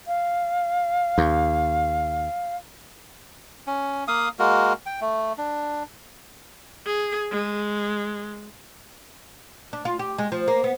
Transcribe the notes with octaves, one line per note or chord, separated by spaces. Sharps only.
F5
D#2
C#4
A#3 F5 D#6
G#3 A#3 F#4 A#4
G5
A3
D4
G#4
G#3
D4
F4
G4
G#3
F3
A#3
B3